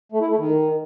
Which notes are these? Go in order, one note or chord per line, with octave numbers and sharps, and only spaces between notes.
A3
E4
A3
D#3